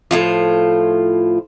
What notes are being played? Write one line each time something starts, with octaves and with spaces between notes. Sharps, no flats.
A2 C#3 F3 F4